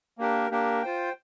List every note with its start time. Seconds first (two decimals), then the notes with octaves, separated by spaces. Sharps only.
0.18 A#3 D4 G4 A#4
0.51 A#3 D4 G4 A#4
0.82 F4 C5 G5